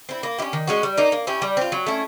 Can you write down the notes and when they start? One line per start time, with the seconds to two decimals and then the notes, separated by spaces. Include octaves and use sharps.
0.09 C4 E4
0.23 A#3
0.38 E4 G4
0.42 C#4
0.53 D#3
0.67 G#3 C#4 F#4
0.83 G3
0.97 A#3 D#4
1.12 A#3
1.27 C#4 E4 G4
1.42 G3
1.57 C4 F4
1.72 F#3
1.86 A3 C#4 E4